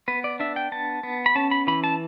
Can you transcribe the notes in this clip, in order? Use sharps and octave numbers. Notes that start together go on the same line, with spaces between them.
B3 B4
D5
D4 E5
G5
B3 A5
B3
B5
C#4 A5
B5
E3 B5
A5